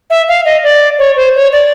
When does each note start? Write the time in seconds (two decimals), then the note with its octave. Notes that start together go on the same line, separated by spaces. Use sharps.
0.10 E5
0.28 F5
0.45 D#5
0.64 D5
0.99 C#5
1.16 C5
1.35 C#5
1.52 D5